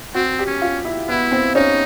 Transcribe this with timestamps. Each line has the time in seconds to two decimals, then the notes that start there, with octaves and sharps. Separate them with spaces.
0.14 C4 F#4
0.39 G4
0.46 C#4
0.62 F4
0.85 E4
1.09 B3 E4
1.32 C4
1.55 C#4 D#4